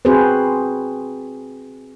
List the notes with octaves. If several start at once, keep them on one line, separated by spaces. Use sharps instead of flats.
C4 F#4 G#4 B4 C5